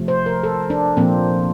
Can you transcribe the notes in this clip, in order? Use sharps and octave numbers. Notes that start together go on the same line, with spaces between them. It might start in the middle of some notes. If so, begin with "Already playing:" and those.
Already playing: C3 F3 A3
C5
A#4
A4
D4
A#2 F3 A#3 C4